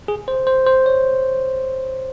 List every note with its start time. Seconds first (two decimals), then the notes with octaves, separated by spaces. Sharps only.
0.08 G#4
0.28 C5
0.47 C5
0.66 C5
0.86 C#5